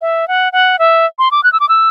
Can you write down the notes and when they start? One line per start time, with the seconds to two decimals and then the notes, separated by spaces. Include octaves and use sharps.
0.01 E5
0.28 F#5
0.53 F#5
0.79 E5
1.19 C6
1.31 D6
1.44 F#6
1.53 E6
1.60 D6
1.69 E6